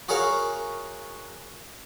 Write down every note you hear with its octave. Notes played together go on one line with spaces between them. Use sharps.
F#4 G#4 A#4 C#5 F5